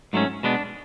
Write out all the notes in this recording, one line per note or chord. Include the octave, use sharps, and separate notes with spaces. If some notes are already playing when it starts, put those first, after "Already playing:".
G#2 F#3 A3 C#4
B2 G#3 B3 D4